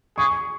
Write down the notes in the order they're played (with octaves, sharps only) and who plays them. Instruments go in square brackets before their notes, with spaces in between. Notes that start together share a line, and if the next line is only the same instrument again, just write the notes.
[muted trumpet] G#4 [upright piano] C#6